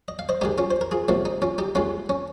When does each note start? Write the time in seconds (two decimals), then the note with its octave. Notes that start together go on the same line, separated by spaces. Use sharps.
0.08 D#5
0.19 F5
0.29 C5 D#5
0.41 G2 D#3 G#3 D#4 G4
0.58 C#4 F4
0.71 C5
0.81 A#4
0.91 F4 G#4
1.08 C#2 C3 F3 A#3 C#4
1.25 D#4
1.42 C#4 F4
1.58 D#4 G4
1.75 D#2 D#3 G#3 C#4 F4
2.09 C#4